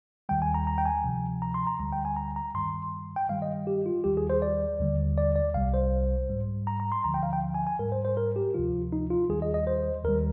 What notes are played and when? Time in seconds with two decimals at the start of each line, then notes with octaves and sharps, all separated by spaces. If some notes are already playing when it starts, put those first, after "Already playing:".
0.29 D#2 D#3 G3 G5
0.42 G#5
0.54 A#5
0.67 A#5
0.78 G5
0.86 G#5
1.04 D2 C3 F3
1.42 A#5
1.54 C6
1.67 A#5
1.79 D2 D3 G3 A#5
1.92 G5
2.05 G#5
2.16 A#5
2.36 A#5
2.54 G2 D#3 G3 C6
3.16 G5
3.29 G2 D#3 G3 F5
3.42 D#5
3.67 G4
3.86 F4
4.04 D#2 D#3 G3 G4
4.17 G#4
4.30 C5
4.42 D5
4.79 D#2 D3 G3
5.18 D5
5.36 D5
5.54 C2 C3 G3 F5
5.74 C5
6.29 G#2 G3
6.67 A#5
6.80 A#5
6.92 C6
7.04 D2 D3 F3 A#5
7.14 G5
7.23 F5
7.33 G5
7.55 G#5
7.67 G#5
7.79 G#2 G3 A#4
7.92 C5
8.05 C5
8.17 A#4
8.36 G4
8.54 D2 C3 F3 F4
8.93 D#4
9.10 F4
9.29 D#2 D#3 G3 G#4
9.42 D#5
9.54 D#5
9.67 C5
10.04 D#2 D#3 G3 A#4